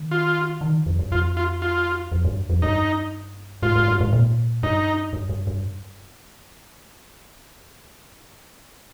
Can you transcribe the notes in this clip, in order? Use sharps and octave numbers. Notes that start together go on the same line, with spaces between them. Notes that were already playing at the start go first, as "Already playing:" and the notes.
Already playing: D#3
F4
D#3
F2
G2
F2 F4
F4
F4
F2
G2
F2
G2 D#4
G#2 F4
G#2
G2
G#2
A#2
G2 D#4
G2
G2
G2